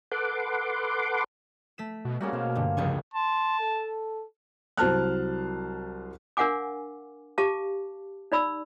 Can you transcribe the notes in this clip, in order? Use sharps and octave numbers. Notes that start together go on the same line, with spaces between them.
A4 B4 F#5 C6 D6
A3 B6 E7
B2
C#3 G3 A#3 F#4
B2 C5 F5
G2 D3
F1 C#2 C#3 C#6
A5 C6
A4
C2 F#3 C5 A5 F6 F#6
D4 A#4 F5 F#5 G#5 D6
G4 F5 A5 D6
D#4 D5 B5 E6